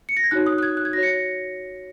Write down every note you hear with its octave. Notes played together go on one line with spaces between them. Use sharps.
C#7
A#6
G#6
D#4 F#4 C#5 F#6
D#6
F#6
G#6
F#6
G#6
F#4 C#5 A#6
C#7